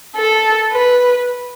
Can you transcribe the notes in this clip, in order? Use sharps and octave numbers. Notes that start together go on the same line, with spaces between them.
A4
B4